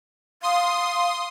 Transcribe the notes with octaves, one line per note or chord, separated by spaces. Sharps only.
F5 C6 D#6